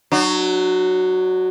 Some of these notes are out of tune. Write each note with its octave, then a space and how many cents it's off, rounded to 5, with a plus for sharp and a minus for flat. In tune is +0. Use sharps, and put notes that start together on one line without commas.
F#3 +0 D4 +45